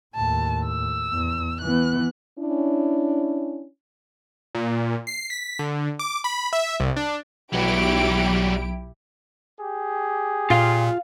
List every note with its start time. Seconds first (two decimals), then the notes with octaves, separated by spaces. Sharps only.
0.15 D#2 A2 A5
0.65 E6
1.12 E2
1.61 E3 B3 F#6
2.39 C#4 D4 E4
4.55 A#2
5.07 C7
5.30 B6
5.59 D3
5.99 D6
6.24 B5
6.53 E5
6.80 C2
6.96 D4
7.53 B1 F#3 G3 E4 G4 D7
9.60 G4 G#4
10.50 A#2 F4 F5